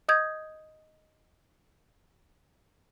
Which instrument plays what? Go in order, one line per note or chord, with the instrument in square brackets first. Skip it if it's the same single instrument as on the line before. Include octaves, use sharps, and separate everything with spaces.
[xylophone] D#5 D#6 G6 G#6